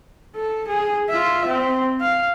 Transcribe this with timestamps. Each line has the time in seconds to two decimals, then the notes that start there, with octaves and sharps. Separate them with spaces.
0.36 A4
0.68 G#4
1.09 F4 E5
1.46 C4
2.01 F5